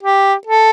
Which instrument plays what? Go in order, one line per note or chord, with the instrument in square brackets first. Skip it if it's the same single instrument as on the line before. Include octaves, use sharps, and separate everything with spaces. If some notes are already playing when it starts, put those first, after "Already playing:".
[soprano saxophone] G4
A4